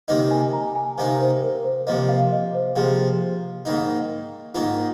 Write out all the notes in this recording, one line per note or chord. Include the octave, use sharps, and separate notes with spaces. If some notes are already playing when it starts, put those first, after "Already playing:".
C3 D#3 A#3 D#4 D#5
G#5
A#5
G#5
C3 D#3 A#3 D#4 F5
C5
A#4
C5
C3 F3 A#3 D#5
F5
D#5
C5
C3 F3 A#3 G#4
G#2 D#3 A#3 D#4
G#2 D#3 A#3 D#4 F4